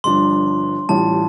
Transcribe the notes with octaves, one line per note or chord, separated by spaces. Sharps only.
G1 G2 F3 D4 C6
A1 A2 G3 F4 A5